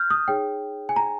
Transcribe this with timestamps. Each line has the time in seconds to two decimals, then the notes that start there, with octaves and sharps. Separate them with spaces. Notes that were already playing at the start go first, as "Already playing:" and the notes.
Already playing: F6 G6
0.10 D#6
0.28 D#4 G#4 C#5 G5
0.89 G#5
0.96 A#5